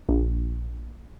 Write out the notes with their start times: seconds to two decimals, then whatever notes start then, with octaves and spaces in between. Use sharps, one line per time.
0.09 A#1